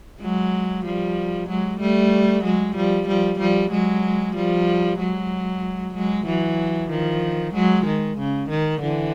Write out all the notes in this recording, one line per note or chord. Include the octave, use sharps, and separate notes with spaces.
F#3 G#3
F3 G3
F#3 G#3
G3 A3
F#3 G#3
F3 G3
F3 G3
F3 G3
F#3 G#3
F3 G3
F#3 G#3
F#3 G#3
E3 F#3
D#3 F3
F#3 G#3
D#3
C#3
D#3
D3 E3